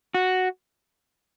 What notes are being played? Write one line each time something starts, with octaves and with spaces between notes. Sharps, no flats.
F#4